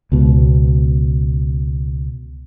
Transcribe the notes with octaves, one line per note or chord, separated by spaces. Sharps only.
C#2 B2